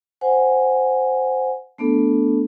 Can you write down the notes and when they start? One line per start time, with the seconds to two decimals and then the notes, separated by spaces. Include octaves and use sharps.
0.21 C5 F#5 G#5
1.78 A3 B3 D4 A4